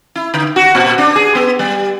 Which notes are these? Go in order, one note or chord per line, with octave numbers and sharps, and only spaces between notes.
E4
D3
F#4
A#2
D4
G#4
B3
G3